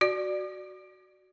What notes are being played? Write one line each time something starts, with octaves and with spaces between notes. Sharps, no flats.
F#4 D5